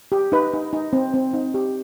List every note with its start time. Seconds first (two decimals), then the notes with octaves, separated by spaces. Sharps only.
0.12 G4
0.32 D#4 B4
0.53 D#4
0.73 D#4
0.93 C4
1.14 C4
1.34 D#4
1.54 G4